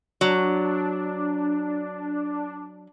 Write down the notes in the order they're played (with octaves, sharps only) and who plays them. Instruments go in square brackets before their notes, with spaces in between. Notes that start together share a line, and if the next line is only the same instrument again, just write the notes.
[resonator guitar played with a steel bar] F#3 [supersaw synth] D4